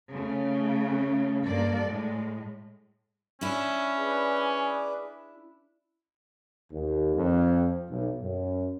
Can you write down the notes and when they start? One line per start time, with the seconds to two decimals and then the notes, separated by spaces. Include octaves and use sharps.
0.12 C#3 A3
1.45 G2 A#3 A4 D5
1.87 A2 G#3
3.41 C#4 D4 E4
3.97 G#4 B4 D5
6.72 D#2
7.16 F2
7.90 B1
8.21 F#2